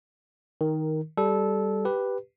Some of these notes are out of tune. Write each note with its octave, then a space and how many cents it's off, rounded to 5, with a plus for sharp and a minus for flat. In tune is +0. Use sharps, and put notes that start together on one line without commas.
D#3 +10 A#4 +0
G3 +0 A4 -20
G4 +0 B4 +0